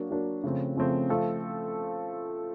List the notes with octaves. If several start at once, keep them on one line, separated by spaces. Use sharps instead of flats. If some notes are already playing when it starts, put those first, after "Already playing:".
Already playing: F#3 A#3 D4
F#3 A#3 D4
C#3 F3 A3 C4
C#3 F3 A3 C4
F3 A3 C4 F4 A4